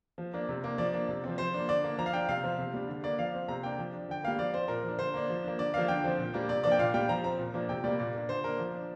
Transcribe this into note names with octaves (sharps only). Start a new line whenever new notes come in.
F3
A#3 D4
C3
A#3 D4
F3 D5
A#3 D4
C3
F3 C4
F3 C5
A#3 D4
D3 D5
A#3 D4
F3 A#5
F5
D4 G5
C3 F5
F3 C4
C3
G3 D4
D3
A#3 D4 D5
F3 F5
C4
C3 A#5
A#3 D4 G5
F3
D4
D3 G5
G3 A#3 F5
F3 D5
C4 C5
A#2 A#4
F3 D4
D3 C5
A#3 D4
F3
A#3 D4
D3 D5
F3 A#3 D4 F5
D3 G5
F3 C4
A#2
G3 A#3 D4
C3 D5
F3 A#3 D4 D5
G5
A#2 F5
G3 D4 G5
F3 A#5
C4 A#5
A#2
F3 A#3 D4
C3 G5
G3 A#3 D5
A#2 D5
A#3 D4
D3 C5
A#3 D4 A#4
F3
D4